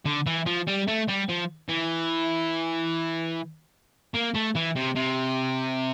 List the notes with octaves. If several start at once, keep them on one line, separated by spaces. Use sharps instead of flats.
D3
E3
F3
G3
A3
G3
F3
E3
A#3
A3
E3
C3
C3